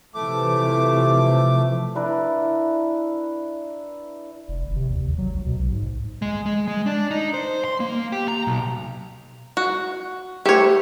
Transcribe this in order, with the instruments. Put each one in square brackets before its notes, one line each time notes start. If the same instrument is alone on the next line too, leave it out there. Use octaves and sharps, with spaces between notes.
[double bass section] C3 E3 F3 [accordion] A3 D6
[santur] D4 E4 A#4 B4
[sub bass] F1
G1
C3
D#2
G#1
F#3
C#2
B2
B1
G#2
[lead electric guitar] G#3
G#3
G#3
D4
D#4
C5
C6
A#3
G4
A#5
B1
[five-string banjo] F#4
[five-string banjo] A3 C#5 [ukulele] G4 C5